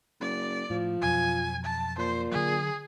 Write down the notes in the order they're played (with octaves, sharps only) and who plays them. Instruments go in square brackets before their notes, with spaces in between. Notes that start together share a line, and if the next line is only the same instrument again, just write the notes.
[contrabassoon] F#1 [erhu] D5
[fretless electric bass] A2 [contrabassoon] F3
[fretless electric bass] F2 B2 F#3 [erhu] G#5
[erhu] A5
[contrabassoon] A#2 [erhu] C5
[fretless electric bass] D3 F#3 [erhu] G#4